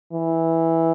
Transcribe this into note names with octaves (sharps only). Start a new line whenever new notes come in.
E3